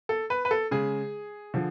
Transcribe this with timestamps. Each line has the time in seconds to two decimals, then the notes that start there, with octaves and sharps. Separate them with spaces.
0.09 A4
0.30 B4
0.45 B4
0.51 A4
0.71 C#3 G#3 G#4
1.54 D3 F3